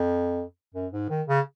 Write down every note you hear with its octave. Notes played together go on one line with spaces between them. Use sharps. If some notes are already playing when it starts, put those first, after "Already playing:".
Already playing: F2
F#2
G#2
D#3
C#3